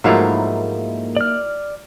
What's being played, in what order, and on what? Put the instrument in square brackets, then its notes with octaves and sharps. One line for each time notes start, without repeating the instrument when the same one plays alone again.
[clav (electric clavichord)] G#2 F3 A3 [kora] F#3 F5 [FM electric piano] A#3 D#4 E4
[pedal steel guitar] D5 F6